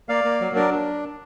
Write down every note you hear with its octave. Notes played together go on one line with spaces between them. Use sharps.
A#3 D5 F5
A#3
F#3
D4 A#4 D5
D4